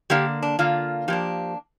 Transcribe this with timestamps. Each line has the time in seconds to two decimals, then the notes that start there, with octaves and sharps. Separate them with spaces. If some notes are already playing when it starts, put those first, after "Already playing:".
0.10 D3 A#3 D4 G4
0.43 D4
0.59 D3 A#3 D4 F4
1.08 F3 A#3 D4 G4